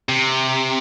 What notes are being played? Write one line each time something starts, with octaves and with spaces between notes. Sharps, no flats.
C3